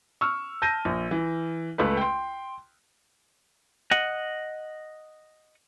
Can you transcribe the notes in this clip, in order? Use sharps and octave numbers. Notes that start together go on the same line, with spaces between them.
C#6 E6 F6
A5 G6 A#6 D#7
A#1
E3
C#2 A3 B4
G5 C6
D#5 F#5